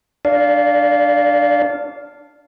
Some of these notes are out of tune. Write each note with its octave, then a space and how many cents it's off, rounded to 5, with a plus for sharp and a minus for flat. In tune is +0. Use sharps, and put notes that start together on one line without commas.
D4 +10 D5 -25 F5 +0